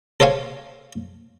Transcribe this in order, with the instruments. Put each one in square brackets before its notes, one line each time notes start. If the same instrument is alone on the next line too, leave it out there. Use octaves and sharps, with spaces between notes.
[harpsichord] A4 C5 C#5 F5 G#5